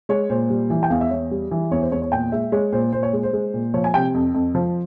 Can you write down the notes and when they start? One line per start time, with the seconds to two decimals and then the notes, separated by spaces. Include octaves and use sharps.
0.09 G#3 C#5
0.30 A#2 C5
0.50 G3
0.70 E3
0.83 G5
0.90 E2 F5
1.01 E5
1.11 E2 C#5
1.31 G3
1.51 E3
1.71 E2 C#5
1.82 C5
1.92 E2 C#5
2.02 C#5
2.12 A#2 G5
2.32 G#3 E5
2.52 G#3 C#5
2.72 A#2 C5
2.93 A#2 C5
3.03 C#5
3.13 G#3
3.23 C5
3.33 G#3
3.54 A#2
3.74 F3 C#5
3.84 G#5
3.94 C3 G5
4.14 F2
4.34 F2
4.55 F3